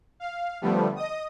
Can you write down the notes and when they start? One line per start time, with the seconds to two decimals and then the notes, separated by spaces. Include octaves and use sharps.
0.20 F5
0.62 D3 F3 G3 A3 B3
0.96 D#5 D#6